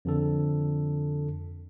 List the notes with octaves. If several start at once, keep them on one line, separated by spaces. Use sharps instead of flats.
F2 D3 A4